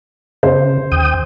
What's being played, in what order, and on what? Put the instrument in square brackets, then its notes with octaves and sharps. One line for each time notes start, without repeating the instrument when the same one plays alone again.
[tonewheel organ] C#3 [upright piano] C5
[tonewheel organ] D#2 G5 D#6